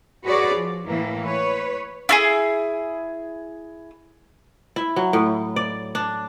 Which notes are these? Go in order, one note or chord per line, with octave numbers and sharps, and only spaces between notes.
F#4 G#4 B4 C#5 D5
F3
A2 E3 A#3
B4 C#5
E4 F#4 G#4
E4
F#3
A2
D5
D4